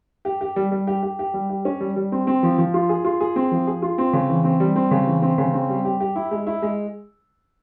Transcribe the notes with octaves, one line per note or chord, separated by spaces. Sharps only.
G4
G4
G3
G3
G4
G4
G4
G3
G4
C#4
G3
G3
C4
C4
F3
F3
F4
G#4
F4
G#4
C4
F3
G#4
F4
C4
C#3
E3
C4
G3
C4
C#3
E3
C4
C#3
C4
G3
G4
G4
E4
G#3
E4
G#3